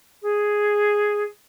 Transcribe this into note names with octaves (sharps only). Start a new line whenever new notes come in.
G#4